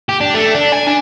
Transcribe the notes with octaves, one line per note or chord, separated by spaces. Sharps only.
G4
D4
A3
D4
G#5
D4